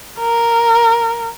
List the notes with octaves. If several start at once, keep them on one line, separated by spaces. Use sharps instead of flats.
A#4